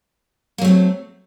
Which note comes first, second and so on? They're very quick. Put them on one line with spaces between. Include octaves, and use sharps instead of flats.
A#3 F#3 A3 C4